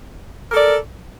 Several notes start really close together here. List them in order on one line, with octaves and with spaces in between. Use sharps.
A#4 A4 D5